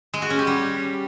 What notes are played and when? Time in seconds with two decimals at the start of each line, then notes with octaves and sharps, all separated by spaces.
0.14 G#3
0.22 F#4
0.30 C#4
0.39 G4
0.47 G3